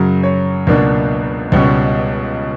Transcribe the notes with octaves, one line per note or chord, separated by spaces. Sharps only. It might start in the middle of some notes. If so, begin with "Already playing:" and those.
Already playing: F#2 C#3 F#3
C#5
C#2 B2 F#3 A#3 D4
C#2 B2 G3 C#4